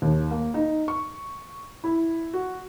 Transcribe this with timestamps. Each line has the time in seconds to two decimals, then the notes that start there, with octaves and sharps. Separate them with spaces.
0.02 D#2
0.31 A#3
0.54 D#4
0.88 C#6
1.84 E4
2.34 F#4